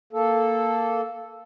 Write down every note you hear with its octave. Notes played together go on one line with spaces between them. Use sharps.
A#3 A4